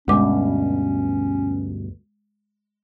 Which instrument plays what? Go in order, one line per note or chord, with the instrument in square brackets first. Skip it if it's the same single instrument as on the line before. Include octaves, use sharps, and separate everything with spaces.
[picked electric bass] D2 G2 B2 [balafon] G#3 D6 [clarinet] C#4